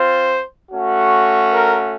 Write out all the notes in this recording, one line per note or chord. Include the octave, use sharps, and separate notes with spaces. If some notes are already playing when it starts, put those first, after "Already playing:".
Already playing: C4 F4 C5
A3 C#4 F#4
A#4